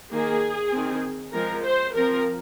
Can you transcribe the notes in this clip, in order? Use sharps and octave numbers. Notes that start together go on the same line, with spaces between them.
D#3 A#3 G#4
D#3 C4
F3 G#3 C4 A#4
C5
F3 C4 A#4